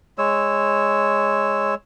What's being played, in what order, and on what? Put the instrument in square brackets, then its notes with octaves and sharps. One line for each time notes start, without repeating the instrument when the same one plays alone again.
[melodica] G#3 C#5 E6